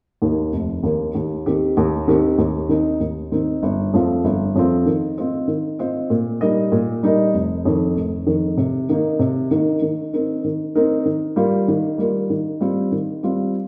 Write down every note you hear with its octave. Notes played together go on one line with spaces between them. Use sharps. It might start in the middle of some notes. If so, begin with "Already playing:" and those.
D#2 D#3 A#3
F1
D#2 D#3 A#3
D#2
D#3 C4 G4
D#2
D#3 C4 G4
D#2
D#3 C4 D#4
D#2
D#3 C4 D#4
G1
F2 F3 C4 F4
G1
F2 F3 C4 F4
D#3
C4 F4 C5 D#5
D#3
C4 F4 C5 D#5
A#2
G3 D#4 A#4 D#5
A#2
G3 D#4 A#4 D#5
F1
F2 D#3
F1
F2 D#3
C3
D#3 A#3 D#4
C3
D#3 A#3 D#4
D#3
C4 D#4 A#4
D#3
C4 D#4 A#4
D#3
G3 A#3 F4
D#3
G3 A#3 F4
D#3
G3 C4 F4
D#3
G3 C4 F4